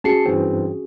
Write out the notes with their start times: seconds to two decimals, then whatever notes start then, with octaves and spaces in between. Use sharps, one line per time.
0.04 C#4 F#4 G#4 A5 C7 C#7
0.26 G2 E3 C4